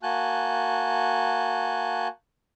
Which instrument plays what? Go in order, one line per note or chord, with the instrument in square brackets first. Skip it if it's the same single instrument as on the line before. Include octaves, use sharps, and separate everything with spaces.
[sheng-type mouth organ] A#3 F#4 G#5 A5 F#6 G6